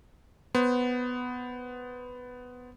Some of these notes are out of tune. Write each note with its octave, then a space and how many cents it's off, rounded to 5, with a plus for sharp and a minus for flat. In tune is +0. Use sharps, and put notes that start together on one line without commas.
B3 +5 C5 +5